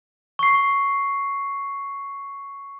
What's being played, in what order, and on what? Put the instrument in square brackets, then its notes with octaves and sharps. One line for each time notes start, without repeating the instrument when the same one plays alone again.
[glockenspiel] C#6 C7